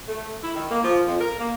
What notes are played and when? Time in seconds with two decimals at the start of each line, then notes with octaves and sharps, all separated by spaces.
0.07 A3
0.42 E4
0.54 D#3
0.70 A#3
0.83 F3
1.06 F2
1.19 A#4
1.40 A#3